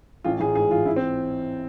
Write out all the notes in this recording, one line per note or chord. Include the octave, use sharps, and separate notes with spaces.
A1 F4
A1 G#4
G#2 G#4
E3 F4
E3 E4
C4